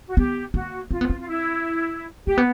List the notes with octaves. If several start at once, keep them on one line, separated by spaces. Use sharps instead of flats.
F#4
B3 G4
A#3 F#4
C4 F4
B3
C4
F4
E4
A#3 G4
B3